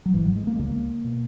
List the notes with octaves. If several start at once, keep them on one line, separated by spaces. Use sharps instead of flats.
F#3
G#1 G#2 E3
F#3
G#3
A#3
G#3
C#2 C#3 A#3
B2